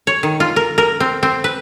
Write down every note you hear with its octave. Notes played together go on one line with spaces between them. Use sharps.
C#5
D#3
F4
A#4
A#4
C4
C4
B4